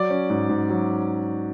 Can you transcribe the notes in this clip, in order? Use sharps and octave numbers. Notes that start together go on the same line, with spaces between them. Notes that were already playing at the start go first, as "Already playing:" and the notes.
Already playing: F#3 D5 D6
C#4
G#2
G#2
F#3